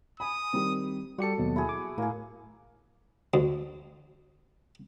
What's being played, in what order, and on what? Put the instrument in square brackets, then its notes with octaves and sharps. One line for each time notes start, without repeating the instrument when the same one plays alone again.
[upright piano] G#5 B5 [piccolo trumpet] D#6
[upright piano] D#3 G3 C4
[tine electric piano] G3 G4 C#7 [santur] F#4 A4
[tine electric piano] D#2 B2 F#3
[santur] E4 F#4 G#4
[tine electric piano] D6
[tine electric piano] A2 [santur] A#3 G#4
[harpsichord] D2